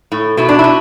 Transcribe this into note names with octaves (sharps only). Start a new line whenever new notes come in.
A2
B2 E4
D4
E4
B2